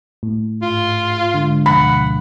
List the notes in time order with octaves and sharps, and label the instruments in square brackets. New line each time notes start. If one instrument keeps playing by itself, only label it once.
[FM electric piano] A2
[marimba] G#2 [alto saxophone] F4
[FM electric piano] D3 [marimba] G#3
[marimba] D2 B2 F3 [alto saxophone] F#5 [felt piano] B5